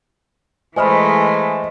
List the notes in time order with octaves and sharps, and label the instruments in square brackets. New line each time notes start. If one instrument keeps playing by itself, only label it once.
[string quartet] E3 G#3 A3 [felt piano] C5 D#5 F6 [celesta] G#5 B5